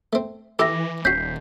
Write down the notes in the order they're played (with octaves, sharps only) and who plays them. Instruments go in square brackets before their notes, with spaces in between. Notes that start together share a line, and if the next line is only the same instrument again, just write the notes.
[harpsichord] A3 C4
[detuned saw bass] E3 [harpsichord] E4 G4 A4 [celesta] D6 A#6
[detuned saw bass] D#1 [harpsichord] C#4 F#4 [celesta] G6 B6 C7